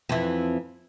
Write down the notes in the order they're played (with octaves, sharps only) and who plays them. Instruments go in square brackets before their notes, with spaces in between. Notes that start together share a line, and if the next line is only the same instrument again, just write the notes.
[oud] F2 E3